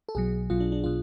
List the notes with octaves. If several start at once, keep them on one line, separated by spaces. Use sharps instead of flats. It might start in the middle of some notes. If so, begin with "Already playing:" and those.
A4
B1 B2 F#3 G#4
B1 B2 F#3 F4
D4
D4
B2 F4